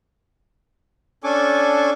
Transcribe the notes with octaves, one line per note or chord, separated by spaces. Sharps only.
C#4 D4 A4 G#5 C#6 D6